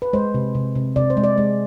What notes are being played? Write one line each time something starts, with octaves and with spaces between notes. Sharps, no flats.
B4
G#3 C5
C3
C3
C3
C3 D5
C5
G#3
D5
G#3